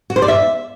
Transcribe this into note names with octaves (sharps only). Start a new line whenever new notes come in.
F#4
C5
D5
E5